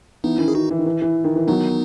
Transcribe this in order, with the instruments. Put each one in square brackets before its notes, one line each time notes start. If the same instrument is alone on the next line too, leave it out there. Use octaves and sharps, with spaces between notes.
[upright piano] E3 [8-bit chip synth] B3 D#4
[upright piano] D#3 [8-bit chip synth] C#4 E4
[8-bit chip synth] G#4
[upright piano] D#3 [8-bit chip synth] D#4 F#4
[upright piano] E3
D#3
E3
E3
D#3
E3
[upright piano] D#3 F#3 [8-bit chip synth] B3 D#4